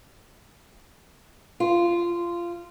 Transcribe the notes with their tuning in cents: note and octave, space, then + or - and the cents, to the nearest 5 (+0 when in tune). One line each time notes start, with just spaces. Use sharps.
F4 -15